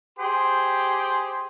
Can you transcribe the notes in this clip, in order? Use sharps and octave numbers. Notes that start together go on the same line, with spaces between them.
G4 G#4 C5